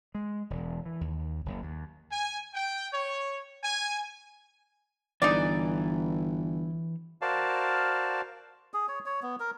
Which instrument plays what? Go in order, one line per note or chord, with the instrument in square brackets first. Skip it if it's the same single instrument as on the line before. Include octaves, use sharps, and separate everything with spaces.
[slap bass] G#3
E1
E3
D#2
F#1
D#2
[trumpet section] G#5
G5
C#5
G#5
[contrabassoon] G1 [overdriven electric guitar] E3 [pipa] D#4 G#4 D5
[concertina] F#4 A#4 C5 D5 F5 A5
[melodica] G#4
C#5
C#5
B3
A#4